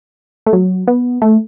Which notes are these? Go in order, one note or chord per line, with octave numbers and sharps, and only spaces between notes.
A3
F#3
B3
A3